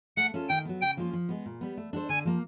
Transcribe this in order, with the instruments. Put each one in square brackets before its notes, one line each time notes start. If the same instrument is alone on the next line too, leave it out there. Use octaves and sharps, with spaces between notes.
[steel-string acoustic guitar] A3 [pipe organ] F#5
[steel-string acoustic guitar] C#4 F4 A4
[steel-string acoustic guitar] D#3 [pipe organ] G5
[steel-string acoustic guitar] F#3 B3
[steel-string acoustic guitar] C#3 [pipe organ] G5
[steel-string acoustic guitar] F3 A#3 C#4 F4
F3
G#3 B3
A#2
G3 B3
A3
D4 F#4 A4 C5
[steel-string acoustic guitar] D3 [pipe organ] G#5
[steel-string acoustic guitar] F3 A#3